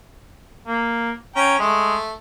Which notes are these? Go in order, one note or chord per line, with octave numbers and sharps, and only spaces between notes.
A#3
C#4 G5 A#5
G#3 A3